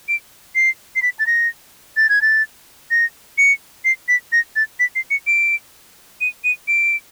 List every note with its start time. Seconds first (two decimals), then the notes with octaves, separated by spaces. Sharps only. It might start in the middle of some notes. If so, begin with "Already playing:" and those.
0.08 D7
0.55 C7
0.96 C7
1.02 B6
1.19 A6
1.27 A#6
1.97 A6
2.09 G#6
2.22 A6
2.91 A#6
3.38 C#7
3.85 C7
4.08 B6
4.32 A#6
4.56 A6
4.80 B6
4.95 C7
5.10 C#7
5.27 D7
6.21 D#7
6.44 D#7
6.68 D7